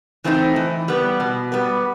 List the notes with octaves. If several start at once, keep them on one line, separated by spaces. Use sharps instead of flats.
E3 A3 C4 D#4
E3
G3 B3
B2
G3 B3